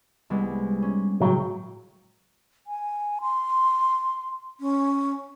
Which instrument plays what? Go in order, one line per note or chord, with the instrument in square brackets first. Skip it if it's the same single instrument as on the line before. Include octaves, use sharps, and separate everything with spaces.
[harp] C2 G#3 B3
C#4
[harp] A2 C#3 G5 [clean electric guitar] F#3
[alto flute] G#5
C6
C#4